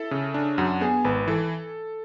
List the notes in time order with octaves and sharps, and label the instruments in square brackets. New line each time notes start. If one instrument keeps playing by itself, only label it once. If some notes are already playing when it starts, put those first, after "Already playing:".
Already playing: [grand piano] E4 [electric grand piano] A4
[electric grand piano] C#3
D4
[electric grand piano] F#2 [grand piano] F#4
[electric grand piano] B3 [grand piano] G#4
[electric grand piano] G#1 [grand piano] B4
[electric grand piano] E3 [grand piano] A4